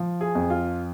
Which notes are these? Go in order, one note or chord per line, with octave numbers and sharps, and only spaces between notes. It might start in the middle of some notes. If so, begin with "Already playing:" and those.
Already playing: F3
G#4
F2
F4